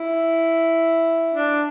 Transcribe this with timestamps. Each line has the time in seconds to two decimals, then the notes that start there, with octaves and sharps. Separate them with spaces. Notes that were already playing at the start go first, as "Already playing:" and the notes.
Already playing: E4
1.34 D4